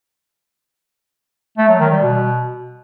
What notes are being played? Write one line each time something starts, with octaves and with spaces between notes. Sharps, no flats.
A3
F#3
D#3
G3
B2